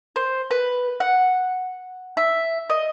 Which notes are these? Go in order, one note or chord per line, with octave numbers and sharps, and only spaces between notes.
C5
B4
F#5
E5
D#5